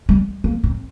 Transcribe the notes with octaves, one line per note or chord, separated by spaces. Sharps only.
G3
A#3
C4